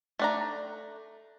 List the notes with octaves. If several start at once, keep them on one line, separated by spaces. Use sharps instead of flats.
A3 D4 A#5